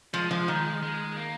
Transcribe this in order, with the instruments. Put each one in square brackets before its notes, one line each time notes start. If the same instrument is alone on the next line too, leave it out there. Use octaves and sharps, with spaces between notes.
[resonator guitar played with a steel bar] F3 [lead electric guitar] G#3
[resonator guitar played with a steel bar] F3
D#3
[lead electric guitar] G#3
A#3